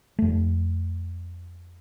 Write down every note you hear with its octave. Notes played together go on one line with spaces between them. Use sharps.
F2 A3